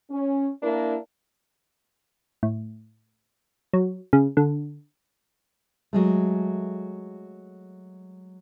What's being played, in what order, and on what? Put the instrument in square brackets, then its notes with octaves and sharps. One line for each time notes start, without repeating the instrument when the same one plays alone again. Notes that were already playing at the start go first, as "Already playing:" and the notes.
[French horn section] C#4
A#3 D4 E4 A#4
[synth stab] A2
F#3
C#3
D3
[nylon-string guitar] F#3 G#3 A3